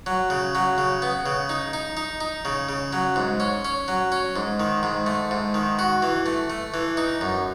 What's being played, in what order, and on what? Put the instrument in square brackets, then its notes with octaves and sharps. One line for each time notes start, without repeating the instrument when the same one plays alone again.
[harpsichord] F#3
C#3
F#3
C#3
B3
C#3
D#4
D#4
D#4
D#4
C#3
C#3
F#3
G#2
C#4
C#4
F#3
C#4
G#2
D#3
G#2
A3
G#2
D#3
F#4
E3
A3
A3
E3
D#4
F#2